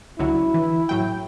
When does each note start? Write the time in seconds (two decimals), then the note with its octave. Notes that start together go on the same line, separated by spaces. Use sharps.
0.19 C#2 D3 F#3 E4
0.54 E3
0.89 A2 F#3 G5